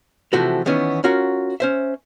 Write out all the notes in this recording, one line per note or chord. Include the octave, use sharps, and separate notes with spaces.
C3 E3 F3 A3 F#4 G4
D#3 E3 B3 C#4
C#4 F4 F#4 A#4
C#4 C5 E5